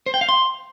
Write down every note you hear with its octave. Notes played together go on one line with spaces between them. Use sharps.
C5
G5
F5
C6